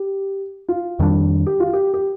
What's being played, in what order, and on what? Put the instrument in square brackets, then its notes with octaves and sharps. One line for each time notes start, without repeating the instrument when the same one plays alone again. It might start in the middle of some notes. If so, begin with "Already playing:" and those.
Already playing: [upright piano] G4
F4
[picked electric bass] F2 D#3 G3 D4
[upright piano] G4
F4
G4
G4